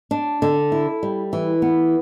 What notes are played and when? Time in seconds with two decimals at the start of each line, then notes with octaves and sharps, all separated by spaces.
0.11 D4
0.42 D3
0.72 E4
1.03 G3
1.33 E3
1.62 B3